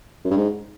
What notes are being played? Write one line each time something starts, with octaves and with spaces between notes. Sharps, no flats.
F#2
G2
G#2